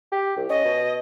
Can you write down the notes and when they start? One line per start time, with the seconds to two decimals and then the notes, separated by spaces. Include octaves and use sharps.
0.12 G4
0.36 C2
0.49 C#4 D#5
0.65 B2